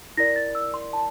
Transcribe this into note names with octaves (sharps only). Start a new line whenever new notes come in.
E4 A#4 D5 A#6
A6
E6
C6
A5